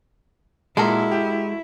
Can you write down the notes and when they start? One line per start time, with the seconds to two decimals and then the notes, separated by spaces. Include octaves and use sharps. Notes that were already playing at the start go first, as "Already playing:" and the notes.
0.77 A#2 G#3 E4 F#4 A4 A#4
1.11 G4